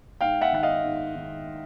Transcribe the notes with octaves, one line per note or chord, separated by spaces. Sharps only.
G#2 F5 G5
E5 F#5
D#3 F#5
D#5 F5
G#2
D#3